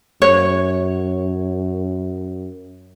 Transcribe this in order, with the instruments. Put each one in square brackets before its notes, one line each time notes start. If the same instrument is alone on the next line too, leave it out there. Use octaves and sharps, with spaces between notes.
[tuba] F#2 [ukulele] C#5